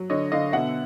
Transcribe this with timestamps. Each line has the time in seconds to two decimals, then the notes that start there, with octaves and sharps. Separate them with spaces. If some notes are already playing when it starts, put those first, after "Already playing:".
Already playing: F#3
0.10 D3 C#5 D#5
0.32 D3 D#5 F5
0.52 B2 E5 F#5